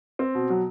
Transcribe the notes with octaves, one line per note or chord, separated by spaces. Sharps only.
C4
B2
F#3